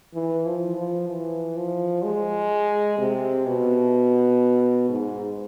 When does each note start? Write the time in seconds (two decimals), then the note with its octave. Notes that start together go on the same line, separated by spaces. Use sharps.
0.14 E3
0.46 F3
0.77 F3
1.09 E3
1.57 F3
2.04 G#3
2.99 C3
3.46 B2
4.89 G#2